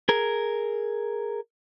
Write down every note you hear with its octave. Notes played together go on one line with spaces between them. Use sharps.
G#4 A#4